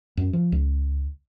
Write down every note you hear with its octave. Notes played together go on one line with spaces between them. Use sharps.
F#2
F3
C#2